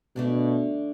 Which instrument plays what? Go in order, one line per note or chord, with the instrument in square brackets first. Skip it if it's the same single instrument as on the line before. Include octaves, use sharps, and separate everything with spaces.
[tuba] B2 [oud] D3 A3 D4